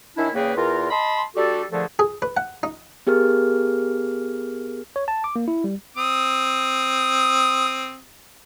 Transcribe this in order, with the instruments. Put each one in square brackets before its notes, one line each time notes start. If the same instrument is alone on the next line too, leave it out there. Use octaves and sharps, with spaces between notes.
[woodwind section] D#3 C#4 D4 E4
E2 C#3 A#3 G#4 B4 G5
E2 F4 A#4
D#5 A5 B5 C6
G3 D4 F#4 G4 A4
A#2 D3 F3 A3 G#4 A4
[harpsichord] G#4
B4
F#5
D#4
[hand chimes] B3 G4 G#4 A#4 F6
[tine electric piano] C#5
A5
D6
A#3
E4
G3
[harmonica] C4 D#6